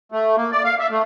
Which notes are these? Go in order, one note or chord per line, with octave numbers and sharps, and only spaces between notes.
A3
A#3
D5
F5
E5
A3